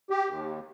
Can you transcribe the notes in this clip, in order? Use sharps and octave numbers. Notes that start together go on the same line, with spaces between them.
G4
D#2